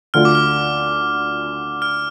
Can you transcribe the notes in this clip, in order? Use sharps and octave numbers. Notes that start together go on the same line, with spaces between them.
D2 D3 A3 F4 F6
D6
F6
F6